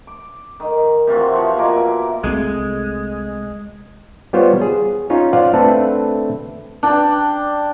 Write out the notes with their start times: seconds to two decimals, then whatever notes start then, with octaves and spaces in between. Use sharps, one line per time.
0.07 D6
0.60 D#3
1.07 C3 E3 F4 F#4
1.34 F3 C#6
1.57 B2 A#3 G#5 D6
1.76 E4
2.24 C2 G#3 A3 C4
4.33 G3 B3 F4 C5 C#5
4.62 G#4
5.10 C#4 D#4 F4 C#5
5.33 F4 C5 D5 F5 F#5
5.53 A3 C4 D4 A4 B4
6.83 D4 G5